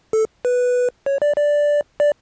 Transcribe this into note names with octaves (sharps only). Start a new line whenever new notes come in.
A4
B4
C#5
D5
D5
D5